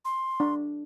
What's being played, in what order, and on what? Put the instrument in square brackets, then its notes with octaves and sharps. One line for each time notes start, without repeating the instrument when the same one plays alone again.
[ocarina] C6
[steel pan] D4